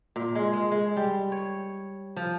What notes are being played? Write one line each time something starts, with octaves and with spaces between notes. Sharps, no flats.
A#2
G#3
G#3
G#3
G3
C#5
F3